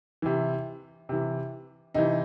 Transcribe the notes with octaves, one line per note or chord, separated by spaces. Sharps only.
C3 E3
C3 E3
C3 E3 D#4